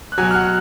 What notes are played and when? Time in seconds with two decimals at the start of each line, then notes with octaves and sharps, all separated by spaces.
0.12 F#6
0.18 B2 F#3 G#5 G#6
0.31 F6
0.35 F#5 F#6